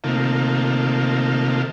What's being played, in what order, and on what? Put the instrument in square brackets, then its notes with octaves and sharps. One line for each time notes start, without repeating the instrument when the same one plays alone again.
[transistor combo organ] C3 D#3 A3 A#3 F4